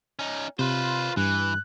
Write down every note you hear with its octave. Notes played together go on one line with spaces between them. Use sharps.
C#4 D#4
C3 F4 B4 C5
G2 E3 F#6